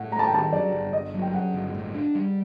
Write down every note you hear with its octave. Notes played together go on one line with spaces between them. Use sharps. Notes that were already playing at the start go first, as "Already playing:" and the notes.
Already playing: A2 F#5
A3 A#5
A5
G5
D#3 A5
F#2 D5
G1
G1 D#5
F#3
G5
F#2 F#5
G1
A2
D4
G3